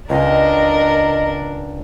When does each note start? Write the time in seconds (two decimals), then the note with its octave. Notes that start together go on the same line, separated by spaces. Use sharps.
0.10 C#2 D4 A#4 D#5